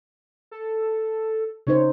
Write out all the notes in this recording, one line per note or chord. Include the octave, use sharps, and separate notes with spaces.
A4
C#3 D#4 C5 C#5